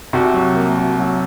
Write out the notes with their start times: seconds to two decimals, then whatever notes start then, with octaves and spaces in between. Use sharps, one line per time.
0.13 C2 C3 F#4
0.34 F#3
0.55 A#3
0.78 F#4
0.99 F#3